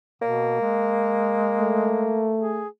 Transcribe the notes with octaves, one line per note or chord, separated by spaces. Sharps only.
B2 A#3
G#3
A3
G#4